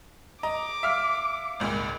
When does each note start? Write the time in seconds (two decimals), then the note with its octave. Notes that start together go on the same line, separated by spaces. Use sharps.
0.43 D#5 A#5 D6
0.83 E5 F5 F6
1.60 G#1 C#2 A#2